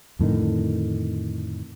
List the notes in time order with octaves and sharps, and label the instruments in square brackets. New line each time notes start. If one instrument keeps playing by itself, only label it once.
[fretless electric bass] F2 A2 D3 D#3